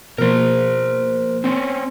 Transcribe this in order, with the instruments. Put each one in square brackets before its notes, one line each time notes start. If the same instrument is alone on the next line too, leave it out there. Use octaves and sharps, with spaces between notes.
[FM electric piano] B2 F3 A#3 [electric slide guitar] A#4 C5
[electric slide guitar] C4 C#4